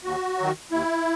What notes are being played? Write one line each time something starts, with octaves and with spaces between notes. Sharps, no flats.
D#2 F#4
D#3 F#3
D#2 E4